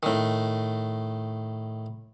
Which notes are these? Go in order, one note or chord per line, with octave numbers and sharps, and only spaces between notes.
A2 D#3